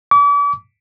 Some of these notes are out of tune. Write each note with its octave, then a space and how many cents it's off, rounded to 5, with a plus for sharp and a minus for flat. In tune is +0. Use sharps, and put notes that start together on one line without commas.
D6 -40